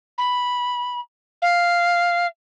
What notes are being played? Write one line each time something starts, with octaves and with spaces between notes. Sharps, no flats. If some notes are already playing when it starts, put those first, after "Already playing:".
B5
F5